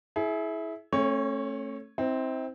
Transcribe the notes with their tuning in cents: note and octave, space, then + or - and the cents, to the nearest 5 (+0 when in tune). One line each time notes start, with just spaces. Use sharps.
E4 -10 G#4 +30
A3 +5 C#4 -45 C#5 +0
C4 +0 E4 -45